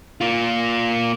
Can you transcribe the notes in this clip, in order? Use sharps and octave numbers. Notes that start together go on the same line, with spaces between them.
A#3 F4